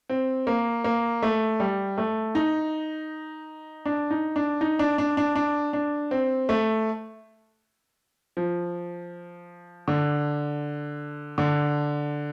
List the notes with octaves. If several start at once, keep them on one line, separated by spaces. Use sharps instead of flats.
C4
A#3
A#3
A3
G3
A3
D#4
D4
D#4
D4
D#4
D4
D4
D4
D4
D4
C4
A3
F3
D3
D3